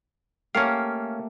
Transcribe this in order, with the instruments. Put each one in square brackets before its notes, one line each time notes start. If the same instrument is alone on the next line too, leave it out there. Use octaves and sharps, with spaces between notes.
[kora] A3 A#3 G4 [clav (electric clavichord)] C#4 F5